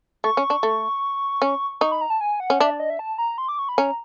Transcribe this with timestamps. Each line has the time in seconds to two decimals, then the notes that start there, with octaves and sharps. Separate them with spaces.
0.24 A3 C#6
0.37 C#4
0.50 D4
0.63 A3
1.42 C#4
1.81 D#4 C#6
1.92 B5
2.01 A#5
2.10 A5
2.21 G#5
2.40 F#5
2.50 C#4
2.60 D4 E5
2.70 D5
2.80 D#5
2.90 E5
2.99 A5
3.18 A#5
3.38 C6
3.48 D6
3.59 C#6
3.69 B5
3.78 C#4 A#5